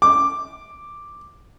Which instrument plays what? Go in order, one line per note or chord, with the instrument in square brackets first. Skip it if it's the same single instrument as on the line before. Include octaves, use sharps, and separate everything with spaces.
[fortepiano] D6